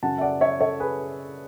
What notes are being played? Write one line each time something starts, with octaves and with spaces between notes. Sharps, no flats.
F#2 C#3 F#3 C#4 F#5 A5
E5
D5 F#5
C#5 E5
A4 C#5
G#4 B4